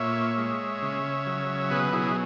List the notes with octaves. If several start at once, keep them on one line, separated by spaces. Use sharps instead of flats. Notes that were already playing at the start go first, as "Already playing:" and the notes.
Already playing: A#2 C#5 E5
G#3
C#3
F#3
B2 G#4 B4
E4 G#4